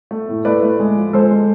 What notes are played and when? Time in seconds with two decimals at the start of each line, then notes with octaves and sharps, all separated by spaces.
0.11 A3
0.29 A2
0.45 A3 B4 D5
0.63 A3
0.80 G#3
0.96 F3
1.13 G#3 A4 C5
1.31 G#3